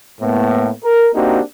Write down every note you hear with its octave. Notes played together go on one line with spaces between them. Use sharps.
A2 A#3 B3
A#4
A#3 C4 D4 D#4 F#4 G4